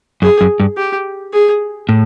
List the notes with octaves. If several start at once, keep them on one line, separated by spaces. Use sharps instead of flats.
F#2 G#4
F#2
G2
G4
G#4
A2